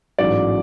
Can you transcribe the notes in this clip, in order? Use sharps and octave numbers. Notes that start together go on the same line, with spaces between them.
A1 G#2 F#3 D5